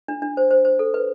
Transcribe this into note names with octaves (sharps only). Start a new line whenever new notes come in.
D4
D4
C5
C5
C5
A4
B4